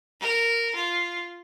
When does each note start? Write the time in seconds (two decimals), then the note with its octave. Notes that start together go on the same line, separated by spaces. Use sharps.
0.20 A#4
0.75 F4